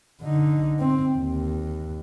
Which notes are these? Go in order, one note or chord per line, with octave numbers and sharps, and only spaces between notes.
D3 D#4
C4
D#2